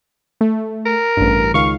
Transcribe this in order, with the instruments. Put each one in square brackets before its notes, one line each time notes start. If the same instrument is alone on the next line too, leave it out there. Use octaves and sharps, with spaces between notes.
[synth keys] A3
[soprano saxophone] A#4
[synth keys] A1 G2
[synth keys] C#2 D#3 F5 [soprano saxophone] C#6